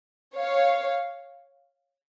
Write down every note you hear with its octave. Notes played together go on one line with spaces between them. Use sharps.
C#5 F5